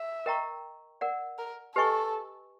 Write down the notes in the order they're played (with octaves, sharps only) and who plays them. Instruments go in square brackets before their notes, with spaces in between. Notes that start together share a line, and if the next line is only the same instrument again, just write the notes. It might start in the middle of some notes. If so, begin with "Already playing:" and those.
Already playing: [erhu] E5
[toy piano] A#4 D#5 G5 A#5 C#6
A#4 D5 F#5
[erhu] A#4
[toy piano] G4 B4 D#5 G#5 C#6 [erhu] A4